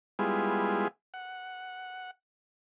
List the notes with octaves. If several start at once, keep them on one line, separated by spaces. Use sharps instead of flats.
G3 G#3 B3 E4 F4 G#4
F#5